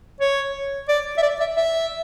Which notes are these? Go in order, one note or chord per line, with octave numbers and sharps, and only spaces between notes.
C#5
D5
E5
D5
E5
E5